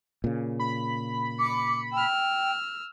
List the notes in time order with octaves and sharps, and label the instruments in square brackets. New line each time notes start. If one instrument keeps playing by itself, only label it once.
[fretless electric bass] A#2 C#3
[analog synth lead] B5
[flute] D6 [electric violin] C#7
[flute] G5 [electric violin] E6 F6